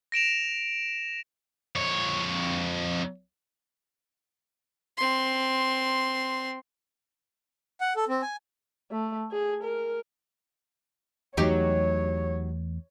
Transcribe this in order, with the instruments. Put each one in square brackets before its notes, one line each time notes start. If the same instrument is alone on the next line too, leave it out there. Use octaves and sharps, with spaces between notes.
[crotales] A#6 D7 E7 F7
[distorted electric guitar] F2 C#5
[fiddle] C4 C6
[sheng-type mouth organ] F#5
A4
C4
G#5
[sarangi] A3
G#4
A#4
[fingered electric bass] E2 E3 A3 [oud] F#3 D#4 G4 [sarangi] C#5